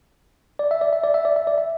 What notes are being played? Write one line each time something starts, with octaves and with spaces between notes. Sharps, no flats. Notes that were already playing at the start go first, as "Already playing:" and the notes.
D5
E5
D5
E5
D5
E5
D5
E5
D5
E5